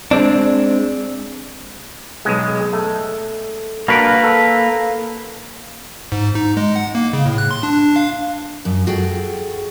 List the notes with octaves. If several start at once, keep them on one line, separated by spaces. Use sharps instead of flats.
G#3 C4 D4
B1 G#3
A3
A#3 D4 F#4 A#4 B4
A4
G#2
D#4
G#3
F#5
A#3
C#3
A2
F#6
C6
D4
F5
F#2
F#4 G#4 A4 G5